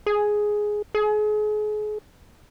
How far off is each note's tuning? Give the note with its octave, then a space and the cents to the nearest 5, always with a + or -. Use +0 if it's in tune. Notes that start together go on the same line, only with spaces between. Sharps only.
G#4 +5
G#4 +35